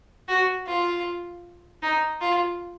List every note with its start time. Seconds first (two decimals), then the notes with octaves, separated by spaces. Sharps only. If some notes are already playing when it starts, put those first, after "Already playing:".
0.28 F#4
0.66 F4
1.83 D#4
2.21 F4